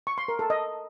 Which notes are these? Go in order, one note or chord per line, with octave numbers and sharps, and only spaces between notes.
C#6
C6
A#4
A4
D#5